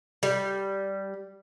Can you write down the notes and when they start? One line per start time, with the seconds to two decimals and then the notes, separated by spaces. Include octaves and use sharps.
0.23 G3